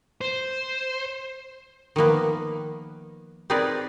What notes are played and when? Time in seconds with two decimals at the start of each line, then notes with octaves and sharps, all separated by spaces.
0.21 C5
1.96 D#3 F3 A#3 B3
3.50 C4 D#4 G#4 A#4 B4 D5